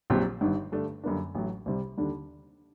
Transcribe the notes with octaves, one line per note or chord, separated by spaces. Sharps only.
A#1 A#2 F#3 C4 G4
G1 G2 D#3
G2 D3 A3 D4
F#2 D3 G3 A#3 D4
A1 A2 F#3
C2 C3 G3
D#2 D3 G3 D4